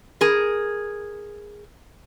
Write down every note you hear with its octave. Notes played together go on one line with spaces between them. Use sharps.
G#4 A#4